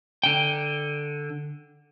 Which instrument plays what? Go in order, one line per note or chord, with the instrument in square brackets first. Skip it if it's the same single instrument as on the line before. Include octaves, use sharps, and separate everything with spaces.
[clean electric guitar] D3 G5